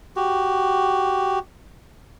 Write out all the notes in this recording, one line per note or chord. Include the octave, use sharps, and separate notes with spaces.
F#4 G4